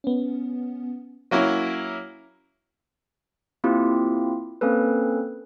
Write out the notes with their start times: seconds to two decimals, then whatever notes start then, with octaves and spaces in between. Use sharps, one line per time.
0.04 B3 C#4
1.31 F#3 A#3 C#4 E4
3.64 A#3 C4 E4 F4 G4
4.61 A#3 C4 C#4 A4 B4